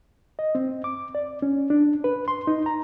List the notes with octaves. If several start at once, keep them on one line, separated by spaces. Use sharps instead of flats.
D#5
C4
D6
D5
C#4
D4
B4
C6
D#4
A#5